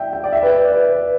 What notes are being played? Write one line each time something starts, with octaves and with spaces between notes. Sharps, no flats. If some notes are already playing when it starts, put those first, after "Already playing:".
Already playing: D5 E5 G5
G5
D5
E5
B4
D5
B4
B4